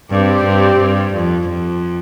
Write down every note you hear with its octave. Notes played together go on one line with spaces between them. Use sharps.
G2 C4 G4 D5
G2
G2
F2
F2